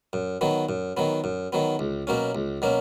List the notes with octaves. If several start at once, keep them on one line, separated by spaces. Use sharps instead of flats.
F#2
D#3 F#3 B3
F#2
D#3 F#3 B3
F#2
D#3 F#3 B3
C#2
B2 F#3 A#3 C#4
C#2
B2 F#3 A#3 C#4